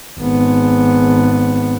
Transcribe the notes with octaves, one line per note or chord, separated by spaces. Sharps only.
G#1 B3